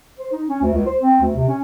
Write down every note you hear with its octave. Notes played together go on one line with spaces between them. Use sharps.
C5
D#4
C#4
D2
C#2
C5
C4
D2
C3
C#4